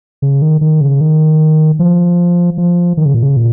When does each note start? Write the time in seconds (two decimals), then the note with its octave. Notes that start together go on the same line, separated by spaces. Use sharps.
0.22 C#3
0.42 D#3
0.61 D#3
0.81 C#3
1.01 D#3
1.79 F3
2.58 F3
2.97 D#3
3.06 C#3
3.14 A#2
3.23 C#3
3.37 A#2